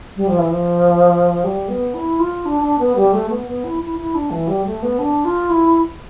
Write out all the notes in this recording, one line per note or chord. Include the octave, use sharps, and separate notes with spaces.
G3
F3
E3
F3
G3
B3
E4
F4
D4
D4
B3
G3
A3
B3
B3
E4
E4
E4
D4
E3
G3
A3
B3
D4
F4
E4